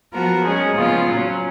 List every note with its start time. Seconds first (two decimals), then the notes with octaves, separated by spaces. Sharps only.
0.11 F3 B3 F#4 A#4
0.43 G#3 C#4 G#4
0.75 C#3 F3 B3 F4
1.08 A#2 F#3 C#4